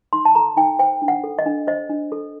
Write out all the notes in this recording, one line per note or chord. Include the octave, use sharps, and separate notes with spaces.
D#4 C6
A5
A4 A#5
D#4 G5
C5 G5
D4
F#5
A4
D#5
D4
C5 D#5
D4
A4